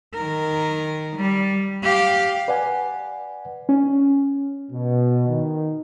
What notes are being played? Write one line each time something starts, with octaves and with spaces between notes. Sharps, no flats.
D#3 A#4
G3
G4 F5
B4 D5 F#5 G#5
C#4
B2
D#3